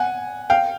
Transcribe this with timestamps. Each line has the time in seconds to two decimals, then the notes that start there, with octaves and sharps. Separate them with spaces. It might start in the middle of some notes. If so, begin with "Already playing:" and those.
Already playing: F#5 G#5
0.50 F5 G5